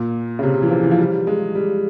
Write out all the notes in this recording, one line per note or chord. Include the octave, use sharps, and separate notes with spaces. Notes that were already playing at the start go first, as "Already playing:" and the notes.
Already playing: A#2
C#3
C3
E3
F3
E3
F3
G3
G#3
G3